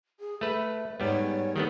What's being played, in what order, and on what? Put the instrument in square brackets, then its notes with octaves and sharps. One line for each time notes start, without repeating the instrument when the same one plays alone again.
[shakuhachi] G#4
[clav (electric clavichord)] A3 B4 [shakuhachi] E5
[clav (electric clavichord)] G#2 G3 B3 [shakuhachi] C#5
[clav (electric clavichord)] D#3 A3 B3 [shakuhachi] G4